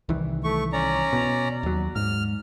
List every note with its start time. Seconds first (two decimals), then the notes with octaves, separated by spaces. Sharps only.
0.09 C2 D#3 E3
0.44 A3 C#6
0.73 C#4 D5 A#5
1.13 B2
1.63 D#2 F#3
1.96 G#2 F6